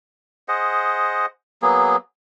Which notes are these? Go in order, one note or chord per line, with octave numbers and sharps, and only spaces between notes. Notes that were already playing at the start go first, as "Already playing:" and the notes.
G#4 C5 D#5 F#5
F#3 A#3 B3 G#4